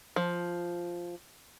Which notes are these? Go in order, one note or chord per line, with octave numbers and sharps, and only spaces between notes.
F3